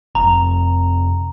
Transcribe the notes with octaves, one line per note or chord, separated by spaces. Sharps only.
F1 A#5